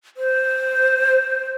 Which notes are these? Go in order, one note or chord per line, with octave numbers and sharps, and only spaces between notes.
C5